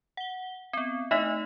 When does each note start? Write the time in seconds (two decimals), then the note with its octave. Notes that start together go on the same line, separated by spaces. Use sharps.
0.17 F#5 G7
0.73 B3 C4
1.11 A3 D#4 D#5 E5